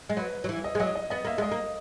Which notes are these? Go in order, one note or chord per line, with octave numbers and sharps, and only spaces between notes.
G#3
F#3 B4
F#3
E3
D#5
G#3
F#3 D#5
D#5
B3 D#5
A#3 E5
G#3 D#5
A#3